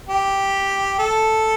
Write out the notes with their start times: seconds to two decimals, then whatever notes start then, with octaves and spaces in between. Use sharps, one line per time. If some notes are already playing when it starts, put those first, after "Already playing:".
0.09 G4
0.99 A4